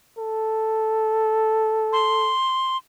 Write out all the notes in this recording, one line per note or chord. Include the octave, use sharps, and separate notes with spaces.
A4
C6